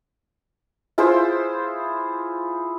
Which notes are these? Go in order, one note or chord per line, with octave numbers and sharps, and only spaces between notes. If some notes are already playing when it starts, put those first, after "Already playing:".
E4 F4 G#4 C5